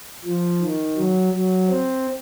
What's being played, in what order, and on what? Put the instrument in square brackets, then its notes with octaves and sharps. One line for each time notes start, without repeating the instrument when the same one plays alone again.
[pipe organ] F3
D#3
F#3
F#3
C4